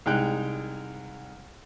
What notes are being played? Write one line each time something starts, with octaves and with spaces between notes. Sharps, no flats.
C2 G#3 D#4 G5 F#6